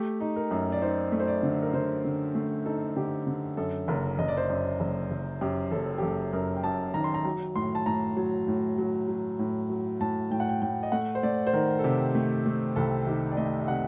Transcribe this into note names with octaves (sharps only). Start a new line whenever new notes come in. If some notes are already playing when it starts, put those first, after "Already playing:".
Already playing: A3 G4
D#4
A#4
F#2
D5
D#4 C5
A3
C5
D5
D3
A#4
D3 C5
D3
A3
D#4 A4
D3 G4
D3
F#2 A4
F#1 A#4
F#1 D#5
D5
C5
F#2 D5
F#1
F#1
F#2 G4
F#1 A4
G4
F#1 A4
F#2 A#4
G5
F#2 A5
D#3 A#5
C6
A#5
F#3 A#5
A2 C6
A5
A2 A#5
F#3
A2
F#3
F#3
A2
F#3
A2 A5
A2 G5
F#5
G5
A2 G5
D#5
A3 F#5
C5
A3 D5
C5
D#3 A#4
A4
C3 G4
A3
A3
C2 A4
D#3 G4
D5
A3 D#5
D#5
C3 F#5